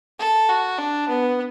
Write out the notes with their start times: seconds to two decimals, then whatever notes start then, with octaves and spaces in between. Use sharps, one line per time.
0.20 A4
0.49 F#4
0.79 D4
1.09 B3